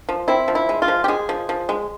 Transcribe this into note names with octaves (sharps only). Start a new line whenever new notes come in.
F3
C4 E4
F3
E4
G#3
F4
F3
G4
G#3 G#4
F3
F3
G#3